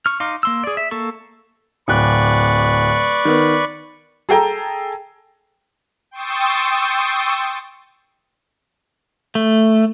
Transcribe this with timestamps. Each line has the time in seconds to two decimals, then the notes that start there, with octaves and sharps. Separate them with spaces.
0.06 C#6 F6
0.20 D#4 F5 C6 D6
0.43 A#3 C6 E6
0.64 G#4 D5
0.77 E5
0.91 A#3 A4 C#6
1.88 D1 B4 D5 C#6 F#6
3.25 D#3 B3
4.29 G#4 A4 G5 A#5
6.11 G5 C6 C#6 D#6 E6 A6
9.35 A3